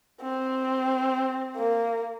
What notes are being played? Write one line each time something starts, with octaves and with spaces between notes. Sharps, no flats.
C4
A#3